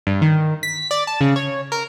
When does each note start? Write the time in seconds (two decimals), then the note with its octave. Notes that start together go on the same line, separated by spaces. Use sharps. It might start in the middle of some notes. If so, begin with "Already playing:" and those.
0.07 G2
0.22 D#3
0.63 B6
0.91 D5
1.07 A5
1.21 C#3
1.36 C#5
1.72 A#4